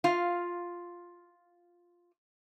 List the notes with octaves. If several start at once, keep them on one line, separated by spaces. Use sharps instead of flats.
F4 F5